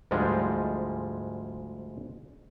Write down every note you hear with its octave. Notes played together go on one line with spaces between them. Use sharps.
D2 G#2 F3 G3 G#3